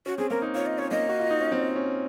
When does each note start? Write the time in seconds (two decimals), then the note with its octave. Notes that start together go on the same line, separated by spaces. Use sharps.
0.06 C#4 F#4
0.18 C4 G#4
0.30 A#3 A#4
0.42 D#4
0.55 F4 C#5
0.66 D#5
0.78 C#4 C#5
0.91 A#3 D#5
1.09 F#4
1.20 F4
1.30 D#4
1.41 C#4
1.52 C4
1.76 C#4